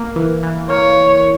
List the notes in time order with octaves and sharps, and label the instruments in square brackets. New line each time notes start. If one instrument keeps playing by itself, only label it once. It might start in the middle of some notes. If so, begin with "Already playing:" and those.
Already playing: [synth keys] A#3
E3
E3
[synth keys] A#3 [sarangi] C#5